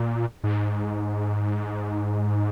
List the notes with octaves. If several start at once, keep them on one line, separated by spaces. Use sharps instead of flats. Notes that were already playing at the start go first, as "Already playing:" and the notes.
Already playing: A#2
G#2